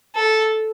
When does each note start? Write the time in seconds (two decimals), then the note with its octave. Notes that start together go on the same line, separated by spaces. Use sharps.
0.16 A4